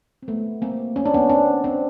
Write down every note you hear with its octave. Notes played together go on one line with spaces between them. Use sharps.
C4
A3 B3
A#3 C4
C#4
D4
B3 C#4
C4 D4
C4 D4